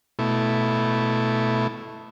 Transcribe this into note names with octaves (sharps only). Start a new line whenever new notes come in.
B2 A3 E4